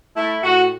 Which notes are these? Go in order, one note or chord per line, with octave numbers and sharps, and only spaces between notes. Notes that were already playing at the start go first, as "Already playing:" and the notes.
A3 E4
A2 F#4